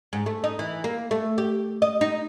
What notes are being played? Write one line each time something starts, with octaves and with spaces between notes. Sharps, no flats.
G#2
A3
D#4
E3
A#3
A3
G4
D#5
D#4